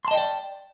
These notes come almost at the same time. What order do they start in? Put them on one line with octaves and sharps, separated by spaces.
C6 A5 D#5 G5 D5